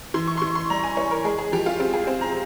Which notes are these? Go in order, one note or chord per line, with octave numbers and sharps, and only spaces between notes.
E3 C6
C#6
C6
E3 C#6
C6
G3 A#5
G#5
G3 C#5
A#4
G#3 G#4
G#4
F3 G4
F4
C4 G4
G#4
C4 C5
A#5